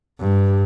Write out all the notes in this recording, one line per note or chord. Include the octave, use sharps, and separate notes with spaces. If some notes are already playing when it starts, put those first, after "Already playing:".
G2